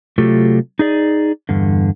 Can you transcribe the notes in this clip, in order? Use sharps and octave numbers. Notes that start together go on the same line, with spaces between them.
C3 F#3 A3 F4 G4 A4
D#4 G#4 D5
E2 G2 D3